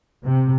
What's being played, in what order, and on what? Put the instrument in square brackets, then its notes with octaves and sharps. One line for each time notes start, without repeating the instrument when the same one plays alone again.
[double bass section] C3